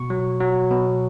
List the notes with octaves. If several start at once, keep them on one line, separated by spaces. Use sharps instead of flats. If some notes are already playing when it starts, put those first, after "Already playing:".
Already playing: B2 C#6
F#3
F#3
B2